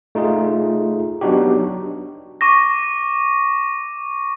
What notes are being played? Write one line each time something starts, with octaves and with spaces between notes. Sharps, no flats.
A3 D#4 F4 G#4
F#3 B3 D4 D#4 F#4 G4
C#6 D6 A#6